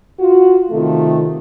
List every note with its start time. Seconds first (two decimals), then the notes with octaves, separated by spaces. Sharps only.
0.19 F4 F#4
0.71 C3 D#3 A3 F4 A4